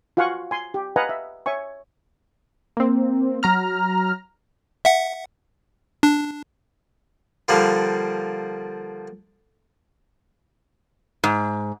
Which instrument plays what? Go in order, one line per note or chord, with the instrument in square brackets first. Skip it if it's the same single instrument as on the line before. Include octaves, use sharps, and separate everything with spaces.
[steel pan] F4 F#4 F5 F#5 G#5 C#6
G#5 C6
G4
B4 D#5 F5 F#5 G#5 A#5
E5
C#5 E5 G#5 C#6
[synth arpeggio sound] A#3 C4
F#3 A#5 F6
[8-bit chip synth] E5 F#5
D4
[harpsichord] D3 F3 G3 A#3 D4
[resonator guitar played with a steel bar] G#2